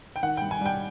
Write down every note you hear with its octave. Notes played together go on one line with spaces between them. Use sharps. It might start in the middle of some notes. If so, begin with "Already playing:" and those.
G5
D#3 F#5
G2 G5
G#5
G3 G5